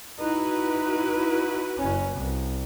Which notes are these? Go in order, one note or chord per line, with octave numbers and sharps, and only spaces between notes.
D#4 E4 F#4 B4
F#1 C#4
C2